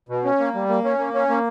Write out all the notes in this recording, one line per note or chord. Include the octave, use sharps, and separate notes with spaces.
B2
C#4
A#3
G3
A#3
C#4
A#3
C#4
A#3